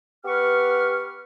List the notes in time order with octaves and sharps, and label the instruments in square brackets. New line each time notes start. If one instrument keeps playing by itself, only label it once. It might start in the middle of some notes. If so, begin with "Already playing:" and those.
[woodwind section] B3 G4 B4 C#6 F6